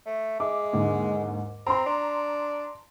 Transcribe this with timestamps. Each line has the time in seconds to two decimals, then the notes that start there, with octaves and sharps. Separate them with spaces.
0.06 A3
0.40 G#3 E5 D6
0.73 D#2 G#2 D3
1.67 C4 A#5 C6
1.86 D4